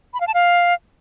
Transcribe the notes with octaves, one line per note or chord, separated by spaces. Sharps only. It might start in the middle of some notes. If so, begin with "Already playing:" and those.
B5
F5
A5
F5